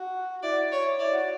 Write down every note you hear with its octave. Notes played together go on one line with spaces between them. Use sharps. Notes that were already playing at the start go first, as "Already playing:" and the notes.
Already playing: F#4
E4 D5
C#5
E4 D5
F#4